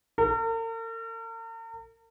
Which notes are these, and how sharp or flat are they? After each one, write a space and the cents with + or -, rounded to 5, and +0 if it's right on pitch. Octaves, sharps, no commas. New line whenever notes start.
A#4 -45